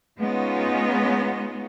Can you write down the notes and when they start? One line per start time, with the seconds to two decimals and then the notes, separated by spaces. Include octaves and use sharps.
0.20 G#3 B3 C#4 D#4 F4